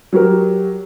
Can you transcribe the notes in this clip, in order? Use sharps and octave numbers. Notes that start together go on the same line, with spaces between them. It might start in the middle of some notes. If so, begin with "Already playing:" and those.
F#3 G4 A#4